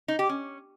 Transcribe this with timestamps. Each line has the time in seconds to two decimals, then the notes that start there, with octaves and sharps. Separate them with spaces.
0.08 D#4
0.19 G4
0.29 C#4